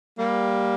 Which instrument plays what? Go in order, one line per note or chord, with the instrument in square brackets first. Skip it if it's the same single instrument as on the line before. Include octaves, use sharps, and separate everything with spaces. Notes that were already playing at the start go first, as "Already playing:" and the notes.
[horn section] G3 A#3